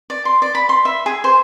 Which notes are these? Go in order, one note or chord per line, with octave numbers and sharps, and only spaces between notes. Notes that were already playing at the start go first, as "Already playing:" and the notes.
D5
C6
D5
B5
C6
E5
G#4
C5